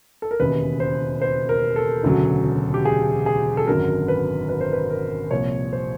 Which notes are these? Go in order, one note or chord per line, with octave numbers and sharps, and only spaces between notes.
A4
A#4
E1 D#2 C#3 E3 B4
C5
C5
A#4
A4
E1 D2 C#3 F#3
G4
G#4
G#4
A4
G#1 F#2 D3 F#3 A#4
B4
B4
C5
B4
A#4
C2 A#2 F3 C#5
C5